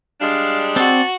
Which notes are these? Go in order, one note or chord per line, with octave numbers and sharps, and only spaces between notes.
G3 G#3 D4 F5
C4 F#4 D5 A5